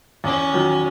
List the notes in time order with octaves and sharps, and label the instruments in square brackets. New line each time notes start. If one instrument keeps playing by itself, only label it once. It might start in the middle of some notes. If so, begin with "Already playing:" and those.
[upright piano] E2 [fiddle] C#4
[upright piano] D#3 F#3